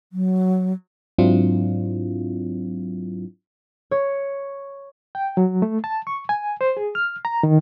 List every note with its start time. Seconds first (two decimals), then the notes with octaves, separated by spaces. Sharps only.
0.13 F#3
1.18 G#2 F#3 C4 D4 E4 F4
3.91 C#5
5.15 G5
5.37 F#3
5.62 A3
5.84 A5
6.07 C#6
6.29 G#5
6.61 C5
6.77 G#4
6.95 F6
7.25 A#5
7.43 D#3